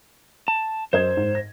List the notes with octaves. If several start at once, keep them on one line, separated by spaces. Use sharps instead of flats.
A5
F#2 C5 D#5 G#6
G#2
A#6